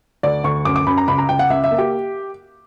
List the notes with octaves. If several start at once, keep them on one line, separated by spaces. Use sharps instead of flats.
D2 D5
D2 C#6
F#2 D6
D6
F#2 B5
A#5
C#2 B5
A#5
C#2 G5
F#5
C#2 E5
E5
A#3
G4